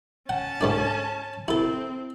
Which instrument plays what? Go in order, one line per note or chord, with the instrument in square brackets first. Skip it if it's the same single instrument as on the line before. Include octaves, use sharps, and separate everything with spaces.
[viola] C#4 A5 [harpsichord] F#5
[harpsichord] G#2 A3 D4
[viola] C4 [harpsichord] E4 A4